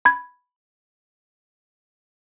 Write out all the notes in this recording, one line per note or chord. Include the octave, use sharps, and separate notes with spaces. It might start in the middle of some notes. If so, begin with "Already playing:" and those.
B5 G#6